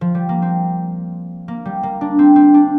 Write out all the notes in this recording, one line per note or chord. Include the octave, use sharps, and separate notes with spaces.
F3
G3
A#3
C4
A#3
G3
A#3
D4
C4
C4
D4